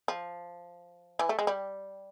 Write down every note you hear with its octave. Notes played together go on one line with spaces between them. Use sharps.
F3
E3
A3
G#3
G3